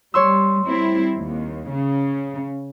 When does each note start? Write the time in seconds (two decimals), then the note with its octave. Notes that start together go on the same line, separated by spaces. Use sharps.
0.14 G3 C#5 C6 E6
0.65 G3 C4 E4
1.16 D#2
1.70 C#3